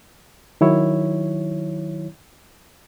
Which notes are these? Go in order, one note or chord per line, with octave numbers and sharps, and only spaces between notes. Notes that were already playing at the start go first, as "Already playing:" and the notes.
D#3 F#3 E4 C#5